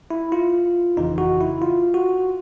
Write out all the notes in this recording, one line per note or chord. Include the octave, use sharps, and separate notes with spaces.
E4
F4
G1 F2 C#3 E3 D#4
F#4
E4
F4
F#4